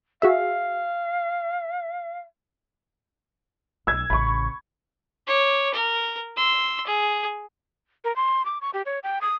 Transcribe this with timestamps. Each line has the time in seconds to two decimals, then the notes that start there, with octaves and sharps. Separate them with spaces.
0.22 F#4 G#4 E5 F5
3.87 B1 E6 G#6
4.10 A1 C#3 B5 C#6
5.27 C#5 D6
5.74 A#4
6.37 C6 E6
6.86 G#4
8.04 A#4
8.16 C6
8.45 D6
8.61 C#6
8.74 G4
8.86 C#5
9.03 G5
9.21 D#6